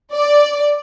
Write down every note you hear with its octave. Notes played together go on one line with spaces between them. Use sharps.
D5